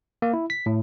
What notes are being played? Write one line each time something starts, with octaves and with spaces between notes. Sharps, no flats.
A#3
E4
B6
A2